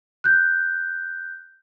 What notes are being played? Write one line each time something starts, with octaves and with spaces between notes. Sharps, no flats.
F#6 G6